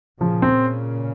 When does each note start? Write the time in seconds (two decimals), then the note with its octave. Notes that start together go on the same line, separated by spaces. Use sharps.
0.21 A#2 C#3 F3
0.42 C4